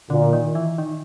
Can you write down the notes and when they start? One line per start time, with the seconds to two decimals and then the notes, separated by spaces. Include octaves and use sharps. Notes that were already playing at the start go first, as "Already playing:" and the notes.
0.10 A#2 D3
0.33 D#3
0.55 E3
0.78 D#3